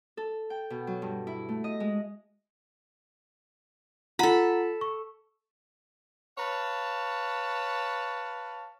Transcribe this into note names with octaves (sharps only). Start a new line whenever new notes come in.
A4
G5
B2
F#3
G2
E4
A3
D#5
G#3
F4 A4 F#5 A#5 B5
C#6
B4 C#5 F5 A5